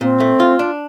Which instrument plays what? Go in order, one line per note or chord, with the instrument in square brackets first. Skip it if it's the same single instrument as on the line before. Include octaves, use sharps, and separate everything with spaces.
[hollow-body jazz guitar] A#2 [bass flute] C4
[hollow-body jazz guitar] A3
F4
D4